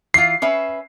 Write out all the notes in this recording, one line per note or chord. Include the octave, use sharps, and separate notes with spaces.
E3 F4 C7
C#4 B4 E5